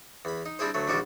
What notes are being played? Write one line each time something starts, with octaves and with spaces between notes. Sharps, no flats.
E2 B5
D#4
G3 C4 D4 E4 G#4 C5
D2 F#3 A3
A#1 A#2 D#3 G3 F#4 D5